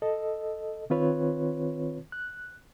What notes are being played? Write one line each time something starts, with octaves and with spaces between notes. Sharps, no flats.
A4 D#5
D#3 C4 F4 B4 C#5
F#6